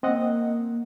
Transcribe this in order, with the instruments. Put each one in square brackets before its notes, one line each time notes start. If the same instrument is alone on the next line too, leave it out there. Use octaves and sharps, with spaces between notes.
[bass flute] A#3 [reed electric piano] C4 D#5 F#5